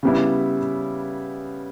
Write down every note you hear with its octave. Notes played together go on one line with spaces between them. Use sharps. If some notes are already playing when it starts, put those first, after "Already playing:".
C#3 G3 B3 E4